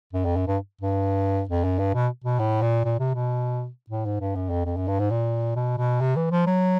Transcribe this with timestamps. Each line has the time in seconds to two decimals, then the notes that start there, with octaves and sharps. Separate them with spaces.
0.13 F#2
0.25 F2
0.36 F#2
0.47 G2
0.81 G2
1.49 F2
1.64 F#2
1.79 G2
1.94 B2
2.24 B2
2.39 A2
2.62 A#2
2.85 A#2
2.99 C3
3.14 B2
3.90 A2
4.05 G#2
4.20 G2
4.35 F#2
4.50 F2
4.65 F2
4.77 F#2
4.88 G2
4.99 G#2
5.11 A#2
5.56 B2
5.78 B2
6.01 C3
6.16 E3
6.31 F3
6.46 F#3